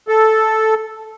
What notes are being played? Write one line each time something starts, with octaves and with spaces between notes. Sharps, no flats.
A4